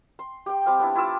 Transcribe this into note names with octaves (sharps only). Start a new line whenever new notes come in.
C6
G4 G5
G3 C4 F5
B3 D4 E4
E4 F4 D6 E6